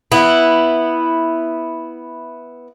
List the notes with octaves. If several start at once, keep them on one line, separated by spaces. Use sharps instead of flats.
B3 E4